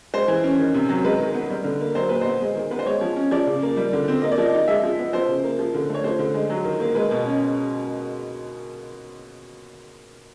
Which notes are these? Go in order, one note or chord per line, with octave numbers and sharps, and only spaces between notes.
G#3 C5
E3
C#4
D#3
C3
F#3
G#3 B4
D#3
B3
G3
D3
A#3
F#3 C5
A#2 B4
B3 C5
G#3
D#3
B3 B4
C5
G#3 C#5
F3
C#4
F3 D5
C#3
A#3
G3
D3
C4
A#3 D#5
D5
F3 D#5
D#4
G#3 E5
F3
B3
F3 C5
C#3
A#3
F3
D3
A3 C#5
F3 C5
D3
G#3
F#3
D#3
A#3
G#3 B4
B2
C#4